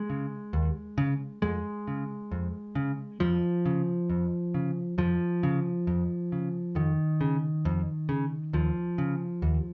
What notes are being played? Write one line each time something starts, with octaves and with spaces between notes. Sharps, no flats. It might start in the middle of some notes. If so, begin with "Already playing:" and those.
Already playing: G#3
C#3
D#2
C#3
F2 G#3
C#3
F2
C#3
F2 F3
C#3
F2
C#3
F2 F3
C#3
F2
C#3
F2 D#3
C#3
F2
C#3
D#2 F3
C#3
D#2